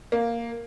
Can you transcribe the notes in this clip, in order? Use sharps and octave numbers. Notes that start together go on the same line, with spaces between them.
A#3